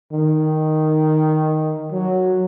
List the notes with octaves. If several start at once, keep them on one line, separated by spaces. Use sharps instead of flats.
D#3
F#3